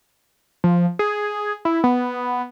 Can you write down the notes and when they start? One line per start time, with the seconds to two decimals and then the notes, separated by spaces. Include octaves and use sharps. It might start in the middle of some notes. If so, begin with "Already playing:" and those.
0.64 F3
0.99 G#4
1.65 E4
1.84 B3